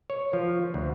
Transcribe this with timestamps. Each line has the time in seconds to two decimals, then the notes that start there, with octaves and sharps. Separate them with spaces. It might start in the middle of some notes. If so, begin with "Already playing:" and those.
0.10 C#5
0.33 F3
0.74 D2